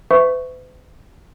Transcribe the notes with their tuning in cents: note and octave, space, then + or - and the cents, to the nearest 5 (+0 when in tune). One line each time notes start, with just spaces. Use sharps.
B4 +45 E5 +0 C#6 +0